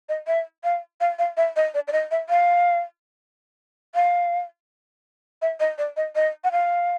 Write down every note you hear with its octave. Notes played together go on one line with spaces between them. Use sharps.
D#5
E5
F5
F5
F5
E5
D#5
D5
D5
D#5
E5
F5
F5
E5
D#5
D5
D#5
D#5
F#5
F5